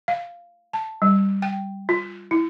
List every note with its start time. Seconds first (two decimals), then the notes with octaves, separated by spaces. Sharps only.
0.08 F5
0.73 A5
1.02 G3
1.42 G5
1.89 F4
2.31 E4